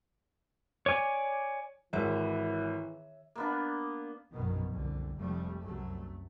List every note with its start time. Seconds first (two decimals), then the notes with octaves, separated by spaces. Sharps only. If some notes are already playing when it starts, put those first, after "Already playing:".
0.86 C#5 D5 G#5
1.93 G#1 D#3 E3 C#5 E5
3.36 A#3 B3 D4
4.32 A#1 F#2 B2 D#3 B3
4.70 C2 D3
5.17 F1 F3 G3 A3
5.62 C2 F#2 F#3 A3